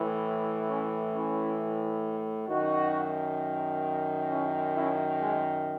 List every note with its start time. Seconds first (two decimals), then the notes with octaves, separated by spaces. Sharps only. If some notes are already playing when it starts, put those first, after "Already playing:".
Already playing: A2 E3
0.68 C#4 E4
1.13 C#4 E4
2.49 F#2 D#3 D#4 F#4
4.29 C#4 E4
4.74 C#4 E4
5.19 G#3